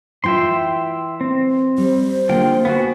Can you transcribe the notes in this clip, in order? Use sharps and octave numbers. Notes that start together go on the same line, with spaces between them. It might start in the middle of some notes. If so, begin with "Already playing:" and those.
E3 E4 F4 E5 G5 C6
C4
G3 C5
D3 A#3 F4 G#4 G5
B3 F#4 F5 G#5